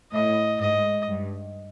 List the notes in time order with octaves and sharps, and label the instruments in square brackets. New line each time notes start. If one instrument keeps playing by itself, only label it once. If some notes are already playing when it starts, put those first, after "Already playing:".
[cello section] A2 [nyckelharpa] D#5
[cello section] G#2 [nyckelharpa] D#5
[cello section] G2